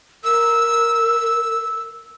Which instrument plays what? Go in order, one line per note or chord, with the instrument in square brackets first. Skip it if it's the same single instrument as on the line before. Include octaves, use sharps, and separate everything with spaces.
[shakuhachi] A#4 [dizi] E6